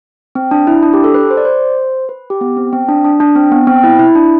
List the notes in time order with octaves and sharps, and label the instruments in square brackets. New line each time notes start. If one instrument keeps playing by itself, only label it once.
[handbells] C4
D4
E4
D4
G4
A4
B4
C5
D5
C5
B4
G4
B3
C4
C4
D4
D4
D4
C4
B3
C4
E4
E4
D4